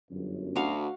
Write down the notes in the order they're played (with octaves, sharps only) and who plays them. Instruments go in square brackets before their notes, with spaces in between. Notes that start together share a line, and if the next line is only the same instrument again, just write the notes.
[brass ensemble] G1 F#2
[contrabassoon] D2 [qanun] F#4 F5